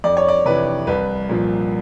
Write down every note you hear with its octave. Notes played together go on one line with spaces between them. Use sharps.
F2 D5
C#5
D5
C3 E3 B4
C2 B4
A#2 F3